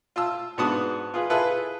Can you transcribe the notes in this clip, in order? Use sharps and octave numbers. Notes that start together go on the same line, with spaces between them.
F4 A5 E6
G#2 B3 D4 F#4 A5 D#6
F4 G#4 B4
E4 F4 G#4 A4 B4